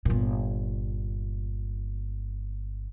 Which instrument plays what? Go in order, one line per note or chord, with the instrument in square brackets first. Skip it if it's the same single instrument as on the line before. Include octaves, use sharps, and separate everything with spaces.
[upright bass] G1 A#2